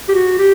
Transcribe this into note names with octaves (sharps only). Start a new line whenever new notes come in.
G4
F#4
G4